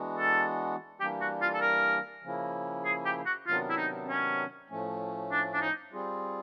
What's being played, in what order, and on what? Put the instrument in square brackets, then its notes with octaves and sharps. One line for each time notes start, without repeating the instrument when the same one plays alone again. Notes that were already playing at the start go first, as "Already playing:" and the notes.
Already playing: [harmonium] E3 G#3 B3 D4 F#4
[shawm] A4
[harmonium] E3 G3 A#3 D4 [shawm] G4
[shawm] F#4
F4
A4
A#4
[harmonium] C#3 F3 A#3 C#4 E4
[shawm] G#4
G4
F#4
[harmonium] C3 D#3 F#3 B3 D4 [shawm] F4
[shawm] E4
D#4
C#4
[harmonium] A2 F3 A3 C#4
[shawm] D4
D4
D#4
[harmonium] G3 C4 F4 G#4